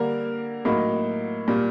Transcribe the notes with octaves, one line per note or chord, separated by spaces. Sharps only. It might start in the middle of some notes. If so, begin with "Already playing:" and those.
Already playing: D3 G3 A#3 A#4
A2 F#3 A#3 D#4
A#2 G3 A#3